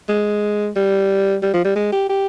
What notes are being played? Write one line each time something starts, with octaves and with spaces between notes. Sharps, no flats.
G#3
G3
G3
F3
G3
G#3
G4
G4